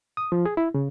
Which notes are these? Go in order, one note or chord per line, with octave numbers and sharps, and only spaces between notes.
D#6
F3
G#4
E4
C#3